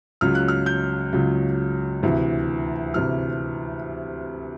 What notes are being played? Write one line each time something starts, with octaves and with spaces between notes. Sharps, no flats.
C#2 C#3 F#3 F6
F#6
F6
G6
C#2 C#3 F#3
D2 C3 E3
D2 C3 E3 F6